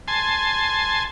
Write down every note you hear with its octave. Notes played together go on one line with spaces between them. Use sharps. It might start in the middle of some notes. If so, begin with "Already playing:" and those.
G#5 A5 C6